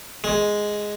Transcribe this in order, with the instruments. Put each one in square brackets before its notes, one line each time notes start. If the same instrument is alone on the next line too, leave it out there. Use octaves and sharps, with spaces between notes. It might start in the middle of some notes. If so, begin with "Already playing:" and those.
[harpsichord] G#3